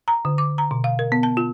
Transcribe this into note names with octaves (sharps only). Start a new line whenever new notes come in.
A#5
D3
D6
A#5
B2
F5
A#4
B3
A5
F4